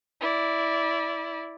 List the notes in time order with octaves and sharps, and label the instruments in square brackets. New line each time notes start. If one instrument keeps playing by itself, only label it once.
[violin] E4 D5